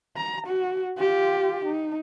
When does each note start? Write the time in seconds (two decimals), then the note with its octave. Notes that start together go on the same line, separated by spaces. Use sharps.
0.17 A#5
0.47 F#4
0.99 F4 G4
1.65 D#4